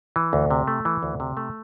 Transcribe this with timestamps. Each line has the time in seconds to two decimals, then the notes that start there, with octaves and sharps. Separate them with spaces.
0.16 E3
0.33 D2
0.51 C3
0.67 A3
0.85 E3
1.03 D2
1.20 C3
1.37 A3